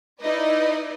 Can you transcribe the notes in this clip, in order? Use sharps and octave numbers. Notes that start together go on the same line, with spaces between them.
D#4 E4 B4 D5 D#5